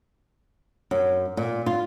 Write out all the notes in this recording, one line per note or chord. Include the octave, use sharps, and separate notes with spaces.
F#2
A#2
F4